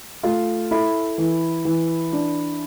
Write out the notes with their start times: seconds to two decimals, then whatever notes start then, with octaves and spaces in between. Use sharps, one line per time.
0.23 A3 F4
0.71 E4 A4
1.18 E3
1.65 E3
2.12 D4